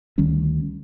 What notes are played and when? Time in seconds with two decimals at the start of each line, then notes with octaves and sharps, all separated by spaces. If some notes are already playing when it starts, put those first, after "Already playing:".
0.18 D2 D#3 G3 C#4